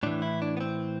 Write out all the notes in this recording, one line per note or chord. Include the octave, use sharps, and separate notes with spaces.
A2 E3 D4
E4
D4
B3
C4